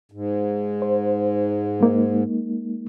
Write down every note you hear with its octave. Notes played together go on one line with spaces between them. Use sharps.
G#2
C5
G#3 A#3 D#4